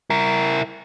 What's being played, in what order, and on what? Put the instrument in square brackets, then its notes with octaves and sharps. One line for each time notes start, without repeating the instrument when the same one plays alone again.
[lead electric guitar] E4 A#4